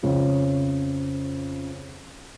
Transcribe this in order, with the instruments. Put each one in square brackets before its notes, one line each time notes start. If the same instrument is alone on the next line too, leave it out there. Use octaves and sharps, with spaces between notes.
[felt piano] F2 C#3